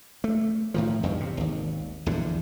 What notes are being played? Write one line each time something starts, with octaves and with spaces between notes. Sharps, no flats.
A3
A2 D#3 F3
E2 G2 B2 D#3
C3
G#1 D#2
A#1 E2 G2 D3